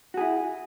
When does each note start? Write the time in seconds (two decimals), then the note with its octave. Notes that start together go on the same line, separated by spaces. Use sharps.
0.14 F#4
0.17 G#4
0.21 E4